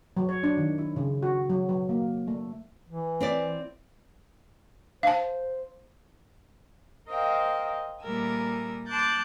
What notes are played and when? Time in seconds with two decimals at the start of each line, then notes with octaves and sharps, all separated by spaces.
0.17 F#3
0.29 C#5
0.43 D4
0.57 D#3
0.78 E4
0.96 C#3
1.23 F#4
1.50 F#3
1.69 F#3
1.89 A#3
2.28 A3
2.89 E3
3.20 C4 E4 D5
5.03 C5 F5 A5
7.08 A#4 C5 D#5 F5 G5
8.03 A#2 G3 A3 A#4 G#5 E6
8.87 A5 C6 D6 F#6 G6 A6